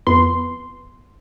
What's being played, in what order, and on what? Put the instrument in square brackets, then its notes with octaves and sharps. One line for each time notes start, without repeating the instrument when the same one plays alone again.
[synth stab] F2 B3 B4 C6